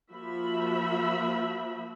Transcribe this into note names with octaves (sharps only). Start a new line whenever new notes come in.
F3 A#3 F#4 E5 B5